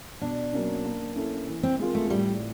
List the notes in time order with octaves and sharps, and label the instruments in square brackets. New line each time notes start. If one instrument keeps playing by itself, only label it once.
[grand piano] B2 [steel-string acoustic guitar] D4
[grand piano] F#3 A#3 C#4
A#3
C#4 E4 A4
E3
[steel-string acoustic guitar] C4
[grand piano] G#3 C4 F4 A#4
[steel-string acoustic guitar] A3
[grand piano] A2 [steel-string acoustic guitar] G3